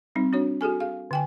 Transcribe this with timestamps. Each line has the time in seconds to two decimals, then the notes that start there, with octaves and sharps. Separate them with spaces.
0.15 G3 C4 D#4
0.33 D4 F#4 C#5
0.61 F#4 G#4 A4 G#5
0.80 G#4 F5
1.11 D3 G5 G#5